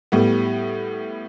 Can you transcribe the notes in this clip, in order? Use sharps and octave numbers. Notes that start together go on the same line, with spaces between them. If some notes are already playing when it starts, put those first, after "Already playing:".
A2 G3 B3